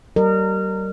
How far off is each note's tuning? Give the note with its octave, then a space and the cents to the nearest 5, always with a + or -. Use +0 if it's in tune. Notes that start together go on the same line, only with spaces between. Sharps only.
G3 -40 A#4 -25 D#5 -35